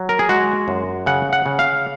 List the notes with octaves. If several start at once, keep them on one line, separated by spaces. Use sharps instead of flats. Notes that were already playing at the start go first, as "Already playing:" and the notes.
Already playing: F#3
A#4
G#4
G#3 F#4
F#2
C#3 F#5
F#5
C#3
F5